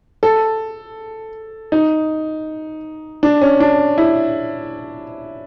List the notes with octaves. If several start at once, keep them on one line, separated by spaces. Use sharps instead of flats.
A4
D#4
D4
C#4
D4
E4